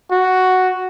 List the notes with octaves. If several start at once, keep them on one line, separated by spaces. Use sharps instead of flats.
F#4